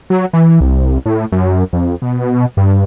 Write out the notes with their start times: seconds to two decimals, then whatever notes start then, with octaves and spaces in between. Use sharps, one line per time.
0.10 F#3
0.33 E3
0.60 C2
1.06 A2
1.32 F#2
1.73 F2
2.02 B2
2.57 G2